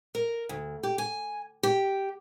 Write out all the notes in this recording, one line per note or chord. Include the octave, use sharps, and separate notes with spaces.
A#4
D2
G4
G#5
G4